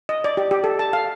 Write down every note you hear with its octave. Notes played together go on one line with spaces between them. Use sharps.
D#5
D5
G4
G4
A4
A5
F5